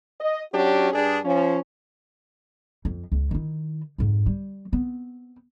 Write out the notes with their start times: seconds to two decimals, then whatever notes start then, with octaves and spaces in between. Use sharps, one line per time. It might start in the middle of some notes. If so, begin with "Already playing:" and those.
0.20 D#5
0.52 F#3 C#4 D4 F#4 G4
0.93 G2 D4 G#4
1.25 F3 C#4
2.85 F2
3.12 C#2
3.31 D#3 E4
3.98 F2 G#2
4.26 G3
4.72 B3 C4